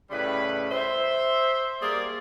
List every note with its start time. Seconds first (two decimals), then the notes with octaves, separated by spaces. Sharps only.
0.10 A2 C#3 G3 E4 B4 B5
0.70 C5 E5
1.81 G3 A#3 G#4 A#4 D5